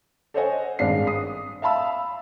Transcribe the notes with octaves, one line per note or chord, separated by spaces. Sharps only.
A4 C5 C#5 D#5 F#5 G#5
G#1 G2 G#3 D4 F5 C7
D#6 C7
E5 F5 A5 B5 E6